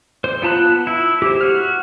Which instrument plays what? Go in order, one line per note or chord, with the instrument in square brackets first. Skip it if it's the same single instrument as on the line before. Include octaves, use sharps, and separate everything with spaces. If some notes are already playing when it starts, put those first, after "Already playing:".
[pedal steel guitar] C5
B3 F4 A5 B5 F#6
E4
G4 C5
F#4 F6